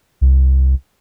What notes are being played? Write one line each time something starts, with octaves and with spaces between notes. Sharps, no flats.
C2